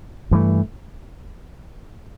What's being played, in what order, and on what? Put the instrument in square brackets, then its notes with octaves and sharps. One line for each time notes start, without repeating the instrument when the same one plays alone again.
[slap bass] G2 E3 A3